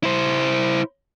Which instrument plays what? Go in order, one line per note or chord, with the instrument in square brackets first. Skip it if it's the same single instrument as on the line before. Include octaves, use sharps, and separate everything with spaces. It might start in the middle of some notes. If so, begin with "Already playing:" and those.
[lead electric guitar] E4 C5